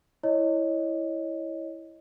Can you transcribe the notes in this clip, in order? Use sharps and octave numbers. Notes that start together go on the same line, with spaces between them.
E4 C#5 D#5